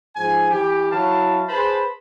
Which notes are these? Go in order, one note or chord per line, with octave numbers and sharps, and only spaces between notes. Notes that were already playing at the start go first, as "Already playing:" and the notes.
G#2 F3 G#5
E3 G4
F#3 E4 F5 A5
G#4 B4 C5 A5 B5